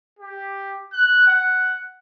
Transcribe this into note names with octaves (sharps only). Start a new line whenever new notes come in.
G4
F#6
F#5